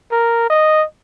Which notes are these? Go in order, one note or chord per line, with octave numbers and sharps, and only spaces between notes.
A#4
D#5